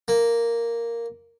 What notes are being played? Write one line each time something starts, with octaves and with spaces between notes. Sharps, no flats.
A#3